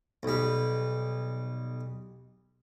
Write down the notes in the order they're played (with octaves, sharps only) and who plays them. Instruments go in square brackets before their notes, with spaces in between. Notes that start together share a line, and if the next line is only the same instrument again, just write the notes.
[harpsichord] B1 G3